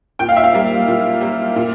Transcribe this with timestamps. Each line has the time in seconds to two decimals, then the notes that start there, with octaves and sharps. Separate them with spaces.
0.19 A#2 G5
0.29 F5
0.36 E5
0.44 F5
0.54 G3 A#3
0.88 A#2
1.21 G3 A#3
1.56 A#2